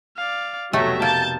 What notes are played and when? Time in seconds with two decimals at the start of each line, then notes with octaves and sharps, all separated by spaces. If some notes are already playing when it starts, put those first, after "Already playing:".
0.17 D5 F5
0.73 F1 B2 F#3 A3 G4 E5 A#6
1.02 A#3 A5 G6